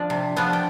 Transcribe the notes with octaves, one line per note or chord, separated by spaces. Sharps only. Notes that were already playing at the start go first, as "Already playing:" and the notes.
Already playing: F3 D4 D5
C3
F3 B3 D4
G5